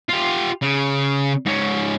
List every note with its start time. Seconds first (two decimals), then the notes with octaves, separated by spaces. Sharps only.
0.09 F4 G4
0.62 C#3
1.46 G#2 C#4